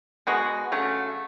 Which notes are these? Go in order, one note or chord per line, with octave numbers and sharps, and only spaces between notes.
B2 G#3 B3 F#4
C#3 F#3 A3